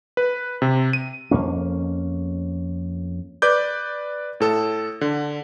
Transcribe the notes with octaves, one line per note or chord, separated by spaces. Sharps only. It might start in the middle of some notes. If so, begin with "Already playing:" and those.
B4
C3
D#7
F2 A#3 C#4
B4 D5 D6 G6
A2 A4 E6
D3